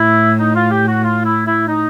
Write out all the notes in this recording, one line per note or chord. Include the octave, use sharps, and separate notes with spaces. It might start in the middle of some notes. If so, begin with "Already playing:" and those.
Already playing: A2 E4
D#4
F4
G4
F#4
F4
E4
E4
D#4